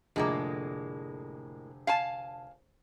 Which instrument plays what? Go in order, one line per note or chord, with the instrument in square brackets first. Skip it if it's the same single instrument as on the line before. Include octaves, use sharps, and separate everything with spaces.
[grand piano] F1 D3 G#4 [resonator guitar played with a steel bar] A2 G#3 A#3
[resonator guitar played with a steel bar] F5 G#5 A5